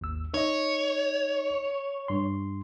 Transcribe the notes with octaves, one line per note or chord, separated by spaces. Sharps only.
G#1 D#2 E6
D#4 C#5 D#5
G2 C6